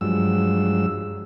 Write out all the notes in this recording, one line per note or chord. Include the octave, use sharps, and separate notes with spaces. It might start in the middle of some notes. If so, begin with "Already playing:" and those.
G2 F3 F#3 G#3 E6